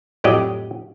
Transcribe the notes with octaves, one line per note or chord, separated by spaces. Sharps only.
F2 A2 F#3 G4 D5 D#5